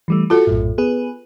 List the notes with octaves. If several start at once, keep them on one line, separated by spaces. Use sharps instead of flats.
E3 G3 A3
F4 F#4 A4 A5
A#1 F#2 A2
B3 G#4 B4